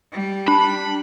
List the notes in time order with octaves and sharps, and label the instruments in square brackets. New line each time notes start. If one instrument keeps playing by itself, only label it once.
[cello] G3
[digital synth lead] D4 [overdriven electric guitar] B5